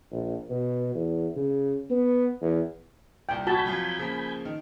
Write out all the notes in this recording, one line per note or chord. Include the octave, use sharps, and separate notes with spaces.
A#1
B2
E2
C#3
B3
E2
D#1 C2 G5
F#4 G#5 A5 B5 G6
F2 F#3 F4
C#3 F3 A#3
D#3